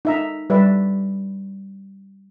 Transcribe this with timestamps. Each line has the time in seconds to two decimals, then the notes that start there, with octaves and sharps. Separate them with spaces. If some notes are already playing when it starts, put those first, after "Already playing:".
0.05 D#4 E5 A#5
0.50 G3 B4 D5 E5